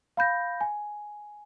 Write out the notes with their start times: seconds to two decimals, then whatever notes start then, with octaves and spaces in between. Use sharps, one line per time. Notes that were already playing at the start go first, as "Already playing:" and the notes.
0.17 F5 B5 G6 A#6
0.61 G#5